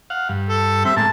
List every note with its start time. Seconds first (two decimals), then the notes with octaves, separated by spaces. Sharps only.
0.10 F5 F#5
0.29 G2
0.49 A4
0.85 G3 C4 E5
0.97 A2 G#3 A#3 A5